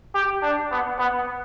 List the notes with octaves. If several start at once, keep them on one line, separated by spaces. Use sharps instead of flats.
G4
D4
B3
B3